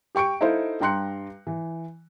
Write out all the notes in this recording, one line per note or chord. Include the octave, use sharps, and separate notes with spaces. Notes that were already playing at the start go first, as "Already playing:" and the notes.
G4 G5 C#6 C#7 D7
D#4 E4 A4 C5 F5
G2 G5 A#5 C6 F#6 C#7
E3